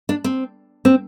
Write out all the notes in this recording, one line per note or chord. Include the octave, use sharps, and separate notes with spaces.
D4
C4
C4